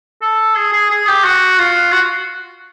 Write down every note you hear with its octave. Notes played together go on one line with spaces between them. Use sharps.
A4
G#4
G#4
G#4
G4
F#4
F4
F#4